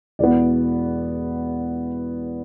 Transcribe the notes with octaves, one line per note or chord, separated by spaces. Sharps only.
E1 E2 E3 B3 D5